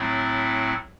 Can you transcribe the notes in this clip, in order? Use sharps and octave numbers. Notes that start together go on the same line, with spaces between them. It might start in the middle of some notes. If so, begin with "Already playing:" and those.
Already playing: A2 F#3 A3 C4 E4